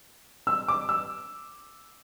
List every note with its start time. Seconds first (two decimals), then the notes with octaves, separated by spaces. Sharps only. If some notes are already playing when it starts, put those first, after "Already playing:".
0.47 E6
0.68 D6
0.89 E6